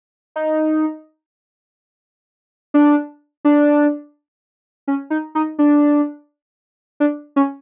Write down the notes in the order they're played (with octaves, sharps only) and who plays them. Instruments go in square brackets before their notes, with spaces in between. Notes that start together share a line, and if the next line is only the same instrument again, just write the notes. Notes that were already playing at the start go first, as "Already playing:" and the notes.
[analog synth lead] D#4
D4
D4
C#4
D#4
D#4
D4
D4
C#4